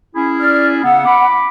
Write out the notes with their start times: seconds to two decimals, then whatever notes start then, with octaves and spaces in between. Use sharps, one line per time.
0.15 C#4 E4 G#4
0.40 D5 F6
0.84 C#3 B3 F#5 E6
1.06 B5 D6